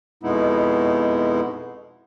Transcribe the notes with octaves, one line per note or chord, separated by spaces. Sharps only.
F2 B2 G#3 B3 D#4 E4